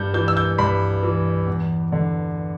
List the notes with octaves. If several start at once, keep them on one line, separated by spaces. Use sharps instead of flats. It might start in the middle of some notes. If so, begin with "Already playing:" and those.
Already playing: G2 G6
E3 G6
E6
G6
G2 B5
E3
E2
D3